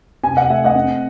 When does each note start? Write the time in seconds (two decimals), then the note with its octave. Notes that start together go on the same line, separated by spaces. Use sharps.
0.23 C3 G#5
0.37 F#5
0.50 A3 E5
0.64 D#5 F#5
0.75 C4